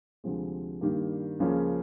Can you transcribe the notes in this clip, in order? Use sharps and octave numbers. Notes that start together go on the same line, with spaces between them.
D2 C3 F3 G#3
G2 D#3 G3 A#3
C#2 C#3 F3 A#3 C#4